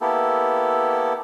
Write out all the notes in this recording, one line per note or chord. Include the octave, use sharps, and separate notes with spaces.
A#3 B3 E4 G4 A4